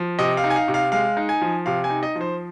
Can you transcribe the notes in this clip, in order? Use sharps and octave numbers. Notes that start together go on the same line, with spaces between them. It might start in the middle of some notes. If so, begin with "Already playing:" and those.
Already playing: F3
C3 D#5
F5
D#4
G#5
F5
C3
F5
G#3 F5
D#4
G#5
F3
C3 F5
G#5
D#4
D#5
F3
C5